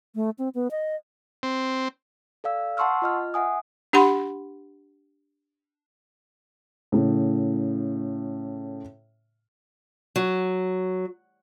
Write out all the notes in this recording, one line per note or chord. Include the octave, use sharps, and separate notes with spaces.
A3
C4
B3
D#5
C4
A4 D5 F5 E6
F#5 A5 C6 C#6 E6 F6
F4 D#5 F6
E5 F#5 G#5 D#6
D4 G4 F#5 B5 C6
A2 C#3
F#3